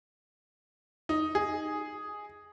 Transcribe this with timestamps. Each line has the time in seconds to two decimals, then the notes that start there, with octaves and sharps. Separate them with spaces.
1.09 D#4
1.35 G#4